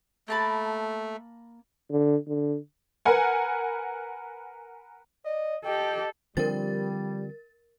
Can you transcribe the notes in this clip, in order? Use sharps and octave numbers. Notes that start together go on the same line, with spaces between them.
A3 A#3 A5 B5
D3
D3
A#4 B4 F#5 G#5
D5 D#5
G4 A4 D#5 G5
D3 F3 G3 C4 A#4 A6